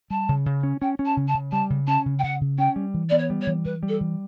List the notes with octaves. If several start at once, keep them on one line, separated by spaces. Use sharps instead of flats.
G3 A5
C#3
C#3
C#4
C#4 G5
C#4
A5
C#3
A5
C#3
G3 A5
C#3
C#4 A5
C#3
G5
C#3 F#5
C#3
C#4 G5
G3
E3
B3 D5
C#5
G3
C#5
E3
E3 B4
G3
A4
E3